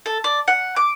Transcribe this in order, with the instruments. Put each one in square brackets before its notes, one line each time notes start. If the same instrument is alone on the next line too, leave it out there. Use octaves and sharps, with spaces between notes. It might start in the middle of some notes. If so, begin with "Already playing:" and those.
[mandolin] A4
D5
F#5
D6